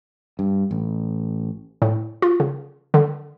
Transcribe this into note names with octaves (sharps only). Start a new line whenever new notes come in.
G2
A1
A2
F4
C#3
D3